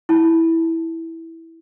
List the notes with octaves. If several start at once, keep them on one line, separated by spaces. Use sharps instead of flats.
E4 A5